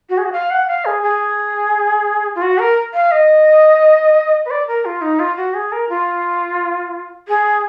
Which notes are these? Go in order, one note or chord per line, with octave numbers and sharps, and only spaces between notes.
F#4
G#4
F#4
F5
F#5
F5
G#4
G#4
F4
F#4
A#4
F5
D#5
B4
D5
A#4
F4
D#4
F4
F#4
G#4
A#4
F4
G#4